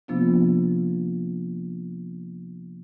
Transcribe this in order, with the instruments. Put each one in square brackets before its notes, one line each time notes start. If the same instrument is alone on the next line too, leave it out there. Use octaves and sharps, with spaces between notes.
[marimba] C3 F3 A#3 B3 D4 F4